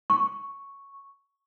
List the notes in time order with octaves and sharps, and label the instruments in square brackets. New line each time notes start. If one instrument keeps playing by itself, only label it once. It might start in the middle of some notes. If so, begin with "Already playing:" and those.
[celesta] C#6